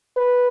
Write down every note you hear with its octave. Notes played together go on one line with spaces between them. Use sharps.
B4